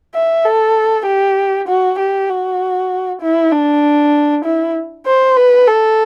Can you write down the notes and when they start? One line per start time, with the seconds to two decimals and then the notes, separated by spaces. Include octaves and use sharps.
0.14 E5
0.45 A4
1.06 G4
1.68 F#4
1.98 G4
2.29 F#4
3.21 E4
3.52 D4
4.44 E4
5.06 C5
5.36 B4
5.67 A4